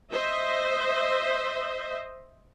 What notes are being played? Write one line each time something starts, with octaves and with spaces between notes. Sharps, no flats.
C5 D#5 E5